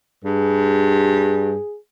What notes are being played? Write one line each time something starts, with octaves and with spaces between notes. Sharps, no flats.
G2 G#4